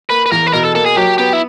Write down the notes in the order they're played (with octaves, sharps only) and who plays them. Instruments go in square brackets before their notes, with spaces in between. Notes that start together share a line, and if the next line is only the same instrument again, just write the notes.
[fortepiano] A#3 [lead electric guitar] B4
[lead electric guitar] B4
[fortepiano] E2 [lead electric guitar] A#4
[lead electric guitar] B4
[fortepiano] B2 [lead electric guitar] A#4
[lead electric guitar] A4
[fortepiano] A#3 [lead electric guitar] A4
[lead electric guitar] G#4
[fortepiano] F#3 [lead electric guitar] G4
[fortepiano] B3 [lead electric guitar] G4
[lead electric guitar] E4